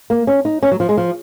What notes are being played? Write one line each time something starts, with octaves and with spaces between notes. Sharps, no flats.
A#3
C#4
D#4
C#4
F#3
F3
G#3
F3